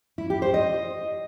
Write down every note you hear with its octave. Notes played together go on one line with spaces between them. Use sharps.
E4
G4
C5
D#5